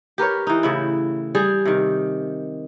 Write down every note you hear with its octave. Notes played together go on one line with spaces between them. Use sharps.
G4 A#4 B4 C#5
E3 D#4
A2 C#3 E4
G3 G#4
C3 D#3